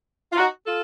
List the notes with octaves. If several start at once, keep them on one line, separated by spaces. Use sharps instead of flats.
F4
D#4 F#4
F4 A4